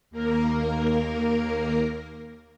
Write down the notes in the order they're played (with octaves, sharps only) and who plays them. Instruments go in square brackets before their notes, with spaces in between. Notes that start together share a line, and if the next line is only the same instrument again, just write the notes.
[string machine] D#2 A#3 A#4